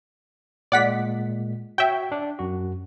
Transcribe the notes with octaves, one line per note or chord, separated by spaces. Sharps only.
A#2 G#3 D5 F#5 B6
F#4 C#5 E5 G5 B6
D4
F#2 F#4